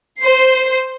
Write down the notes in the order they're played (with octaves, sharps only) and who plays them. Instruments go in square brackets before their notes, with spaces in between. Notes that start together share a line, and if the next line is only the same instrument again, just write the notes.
[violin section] C5 C7